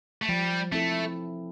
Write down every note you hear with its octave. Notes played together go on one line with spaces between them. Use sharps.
A3
F3 G3
A3 C4 E4 A4